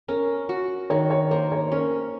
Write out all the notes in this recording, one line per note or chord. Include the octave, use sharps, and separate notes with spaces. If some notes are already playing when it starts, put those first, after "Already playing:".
C#4 A#4
F#4
D#3 C#5
C#5
A#3 C5
C#5
C#4 A#4